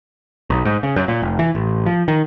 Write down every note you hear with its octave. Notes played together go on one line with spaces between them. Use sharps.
B1
G#2
C#3
F#2
A#2
F1
E3
A1
F3
D#3